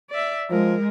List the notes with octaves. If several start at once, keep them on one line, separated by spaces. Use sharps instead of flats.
D5 E5
F3 G#3 A#4